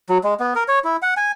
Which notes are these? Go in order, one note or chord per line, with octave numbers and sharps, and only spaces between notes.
F#3
G#3
B3
A#4
C#5
E4
F#5
G#5